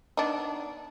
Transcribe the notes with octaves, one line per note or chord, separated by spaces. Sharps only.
B3 D4 D#4